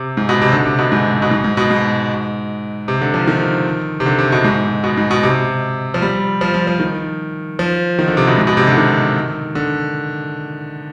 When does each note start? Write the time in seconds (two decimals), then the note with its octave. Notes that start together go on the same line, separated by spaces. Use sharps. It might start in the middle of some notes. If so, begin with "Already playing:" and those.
Already playing: C3
0.17 G#2
0.29 B2
0.41 C3
0.52 D3
0.65 C3
0.79 B2
0.92 G#2
1.22 B2
1.31 G#2
1.44 G#2
1.57 B2
1.71 G#2
2.88 C3
3.02 D3
3.14 F3
3.27 D#3
4.00 C3
4.06 D3
4.18 C3
4.32 B2
4.44 G#2
4.84 B2
4.97 G#2
5.11 B2
5.23 C3
5.94 F3
6.02 G3
6.41 F3
6.54 F3
6.67 F3
6.80 D#3
7.59 F3
7.99 D#3
8.08 D3
8.17 C3
8.27 B2
8.38 G#2
8.47 B2
8.57 C3
8.67 D3
8.77 D#3
9.55 D3